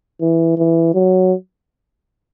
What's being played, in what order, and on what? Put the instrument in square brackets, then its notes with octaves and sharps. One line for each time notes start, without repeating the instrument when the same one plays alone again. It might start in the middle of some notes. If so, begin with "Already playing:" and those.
[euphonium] E3
E3
F#3